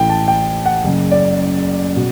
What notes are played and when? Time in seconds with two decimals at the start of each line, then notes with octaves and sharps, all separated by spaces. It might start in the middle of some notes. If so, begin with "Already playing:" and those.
Already playing: A1 A2 E3 G5
0.09 A5
0.28 G5
0.66 F#5
0.84 F#1 F#2 C#3
1.11 D5
1.96 B2